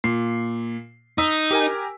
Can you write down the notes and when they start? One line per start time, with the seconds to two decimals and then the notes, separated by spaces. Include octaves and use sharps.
0.04 A#2 C7
1.18 D#4 E6 B6
1.51 G4 A#4 G#5